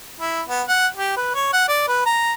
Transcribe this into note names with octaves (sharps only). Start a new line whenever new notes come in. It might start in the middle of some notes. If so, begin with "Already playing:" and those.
E4
B3
F#5
G4
B4
C#5
F#5
D5
B4
A#5